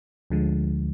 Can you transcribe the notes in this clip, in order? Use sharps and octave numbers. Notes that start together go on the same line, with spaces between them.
D2 D3 F3 G#3